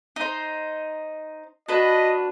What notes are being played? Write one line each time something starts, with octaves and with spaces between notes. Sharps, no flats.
D#4 C5
D4 F#4 B4 D#5